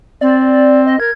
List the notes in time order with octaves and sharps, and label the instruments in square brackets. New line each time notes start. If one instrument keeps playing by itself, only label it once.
[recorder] C4 [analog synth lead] D5
[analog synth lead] D#5
[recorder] A#4 [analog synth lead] G#6